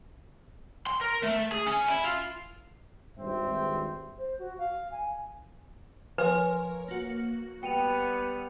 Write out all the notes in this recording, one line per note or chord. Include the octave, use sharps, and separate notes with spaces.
C6
A#4
A3
G#4
C#4
E4
F4
G#1 G2 C4 E5
C5
F#4
F5
G#5
F3 A#4 B4 C#5 G#5
A#3 F#4
G3 B3 G5 C#7 D#7 F7